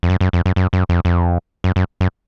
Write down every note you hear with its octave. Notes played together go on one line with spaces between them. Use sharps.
F2
F#2
F#2
F2
F#2
F#2
F#2
F2
F2
F#2
F#2
F#2